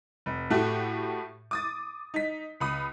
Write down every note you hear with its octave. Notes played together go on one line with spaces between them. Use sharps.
F1
A2 A3 F#4 G4
D6 D#6 A6
D#4 B6
C#2 B5 D#6